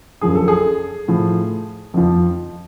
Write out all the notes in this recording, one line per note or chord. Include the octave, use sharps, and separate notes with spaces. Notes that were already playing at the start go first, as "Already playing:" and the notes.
F#2 D3 F3 G#4
A4
G#4
A2 F3
F2 F3